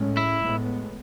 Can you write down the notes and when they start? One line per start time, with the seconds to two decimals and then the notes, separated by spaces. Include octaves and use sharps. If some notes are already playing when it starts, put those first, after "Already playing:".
Already playing: A2 G#3 C#4
0.17 E4
0.42 A2 G#3 B3